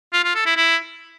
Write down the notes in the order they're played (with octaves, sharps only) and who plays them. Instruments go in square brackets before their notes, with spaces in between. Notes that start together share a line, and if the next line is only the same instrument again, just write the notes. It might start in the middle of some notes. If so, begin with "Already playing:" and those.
[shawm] F4
F4
A4
E4
E4